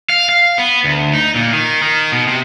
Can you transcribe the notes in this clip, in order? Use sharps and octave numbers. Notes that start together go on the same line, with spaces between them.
F5
F5
B3
D2
D#4
A#2
D#3
D#3
B2
C3